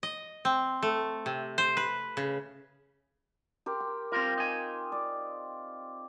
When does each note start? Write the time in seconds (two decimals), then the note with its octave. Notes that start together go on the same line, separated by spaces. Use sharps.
0.03 D#5
0.45 C4
0.82 A3
1.26 C3
1.58 C5
1.77 B4
2.17 C#3
3.66 G4 A#4 C6
3.80 G5
4.12 G3 C4 F4 A#4
4.38 D#4 G#5
4.92 D5